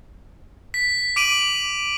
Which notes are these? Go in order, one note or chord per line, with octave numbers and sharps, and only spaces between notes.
B6
D6 D7 D#7 F#7